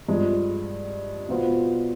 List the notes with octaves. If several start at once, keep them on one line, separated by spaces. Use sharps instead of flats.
G2 F3 G#3
B2 B3 F4 C5